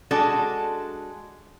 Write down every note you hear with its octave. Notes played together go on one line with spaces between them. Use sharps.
G#3 D4 F#4 A4